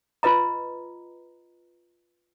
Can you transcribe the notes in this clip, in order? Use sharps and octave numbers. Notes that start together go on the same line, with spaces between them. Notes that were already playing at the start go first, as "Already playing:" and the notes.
F4 B4 D#5 A#5